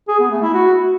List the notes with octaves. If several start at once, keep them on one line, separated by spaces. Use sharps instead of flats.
G#4
B3
A3
E4
F#4